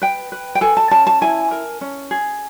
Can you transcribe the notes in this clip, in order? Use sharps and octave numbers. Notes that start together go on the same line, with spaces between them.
B4 G5
B4
G5
A4 G#5
A5
C#4 A5
A5
E4 G#5
A#4
C#4
G#4